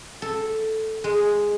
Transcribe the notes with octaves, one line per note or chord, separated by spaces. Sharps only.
A4
G#3